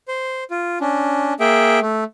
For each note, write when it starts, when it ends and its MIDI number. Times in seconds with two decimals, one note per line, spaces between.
0.08 0.44 72
0.51 0.79 65
0.81 1.34 61
0.81 1.34 62
1.40 1.80 58
1.40 1.80 68
1.40 1.80 76
1.40 1.80 79
1.81 2.04 57